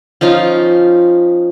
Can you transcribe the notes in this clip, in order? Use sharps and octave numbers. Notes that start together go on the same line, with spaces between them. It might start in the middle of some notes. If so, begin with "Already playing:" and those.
F3 C#4 D#4 F4